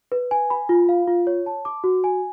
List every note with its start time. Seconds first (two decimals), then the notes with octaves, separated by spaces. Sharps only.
0.12 B4
0.31 G#5
0.50 B5
0.69 F4
0.89 F5
1.07 F4
1.27 C#5
1.46 A5
1.65 D6
1.84 F#4
2.04 G#5